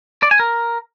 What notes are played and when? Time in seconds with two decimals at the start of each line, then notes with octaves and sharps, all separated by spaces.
0.23 D5
0.31 G#5
0.40 A#4